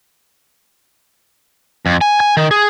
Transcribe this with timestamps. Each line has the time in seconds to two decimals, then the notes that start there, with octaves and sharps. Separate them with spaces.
1.86 F2
2.01 G#5
2.20 G#5
2.37 D#3
2.51 G#4